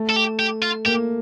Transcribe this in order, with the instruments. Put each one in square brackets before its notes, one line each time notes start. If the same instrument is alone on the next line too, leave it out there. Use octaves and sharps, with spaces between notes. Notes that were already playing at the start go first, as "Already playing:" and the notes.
Already playing: [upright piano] A3
[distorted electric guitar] A4
G4
G4
F4
[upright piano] A#3 [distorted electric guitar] G4